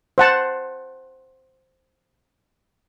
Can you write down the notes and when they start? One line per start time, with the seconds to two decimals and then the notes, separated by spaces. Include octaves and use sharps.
0.18 C5 F#5 A5